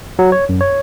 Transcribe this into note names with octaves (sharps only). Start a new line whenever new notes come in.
F#3
C#5
F#2
C#5